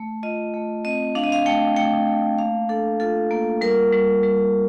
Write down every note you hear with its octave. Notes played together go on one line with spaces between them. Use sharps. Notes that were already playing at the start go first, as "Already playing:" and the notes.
Already playing: A3
F4 D#5
A3
C4 D#5
D4 F5
D#5
F5
A3 G5
A3 G5
A3
A#3 F5
D4 A4
F4 A4
A#3
G3 A#4
G3
G3